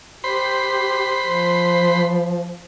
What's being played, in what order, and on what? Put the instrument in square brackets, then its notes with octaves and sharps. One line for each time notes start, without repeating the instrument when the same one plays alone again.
[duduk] G4 [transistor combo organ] C5 B5
[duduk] F3